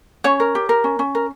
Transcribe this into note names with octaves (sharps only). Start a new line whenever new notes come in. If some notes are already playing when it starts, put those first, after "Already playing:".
C#4 C#5
A#4
G4
A#4
C#4
C#4
A#4